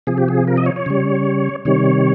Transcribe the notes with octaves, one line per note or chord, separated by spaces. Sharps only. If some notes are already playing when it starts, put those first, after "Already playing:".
C3 F3 G#4
G4
G#4
A#4
D#5
C#5
C#5
C#3 G3
C3 D#3 G3 C#5